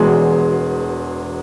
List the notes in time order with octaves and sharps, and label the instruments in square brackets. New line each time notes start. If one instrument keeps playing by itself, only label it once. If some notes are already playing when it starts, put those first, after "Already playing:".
Already playing: [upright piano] E1 E2 B2 G#3 C6